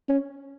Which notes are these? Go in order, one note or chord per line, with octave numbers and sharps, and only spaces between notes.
C#4